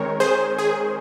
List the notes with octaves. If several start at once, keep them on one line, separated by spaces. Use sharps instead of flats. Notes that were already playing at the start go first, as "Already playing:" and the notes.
Already playing: D#3 G#3 C4 A#4 C#5
G#4 C5
G#4